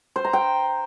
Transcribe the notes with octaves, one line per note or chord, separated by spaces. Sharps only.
C5
A#5
G5